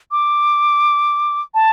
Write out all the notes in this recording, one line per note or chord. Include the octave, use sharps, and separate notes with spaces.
D6
A5